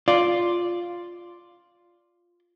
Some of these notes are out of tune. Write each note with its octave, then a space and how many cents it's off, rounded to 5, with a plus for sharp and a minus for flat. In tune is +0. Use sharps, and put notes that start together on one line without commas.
F4 +0 D5 +0